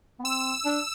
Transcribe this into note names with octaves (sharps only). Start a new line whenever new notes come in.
B3
C4 E6
D4